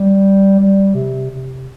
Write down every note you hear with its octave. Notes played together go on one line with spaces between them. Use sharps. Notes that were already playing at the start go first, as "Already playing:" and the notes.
Already playing: G3
G3
C3
C3